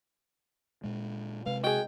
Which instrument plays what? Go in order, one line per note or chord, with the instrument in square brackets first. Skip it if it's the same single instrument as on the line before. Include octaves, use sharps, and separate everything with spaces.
[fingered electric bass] A#2 G#3
[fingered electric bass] C3 G#3 [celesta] B4 [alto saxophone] F5
[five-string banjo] F#4 G#4 [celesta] D#5 [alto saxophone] G5